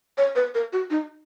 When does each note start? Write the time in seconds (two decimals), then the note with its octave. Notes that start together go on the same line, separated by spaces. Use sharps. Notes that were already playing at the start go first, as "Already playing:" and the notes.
0.18 C#5
0.36 B4
0.54 A#4
0.73 F#4
0.90 D#4